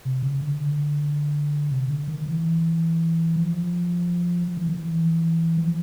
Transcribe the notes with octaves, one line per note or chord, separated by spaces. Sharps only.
C3
C#3
D3
C3
D3
D#3
E3
F3
F3
E3
D#3
E3
F3